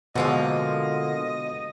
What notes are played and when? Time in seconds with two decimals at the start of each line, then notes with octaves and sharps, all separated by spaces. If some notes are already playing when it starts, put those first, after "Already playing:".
0.15 B2 D3 F3 G#3 A#3 D#5